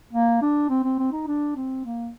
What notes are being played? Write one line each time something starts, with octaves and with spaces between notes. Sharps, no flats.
A#3
D4
C4
C4
C4
D#4
D4
C4
A#3